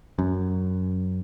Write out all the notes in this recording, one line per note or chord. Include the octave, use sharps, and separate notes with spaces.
F#2